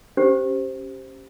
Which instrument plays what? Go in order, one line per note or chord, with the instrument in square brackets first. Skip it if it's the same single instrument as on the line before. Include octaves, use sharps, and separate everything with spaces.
[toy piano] C#4 G4 C5